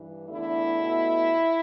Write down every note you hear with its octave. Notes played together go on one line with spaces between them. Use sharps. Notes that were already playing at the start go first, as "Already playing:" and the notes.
Already playing: G2 E3
E2 D3 A3 E4
B2 A3